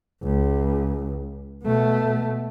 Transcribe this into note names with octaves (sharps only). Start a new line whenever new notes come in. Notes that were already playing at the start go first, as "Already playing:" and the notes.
C#2
B2 A3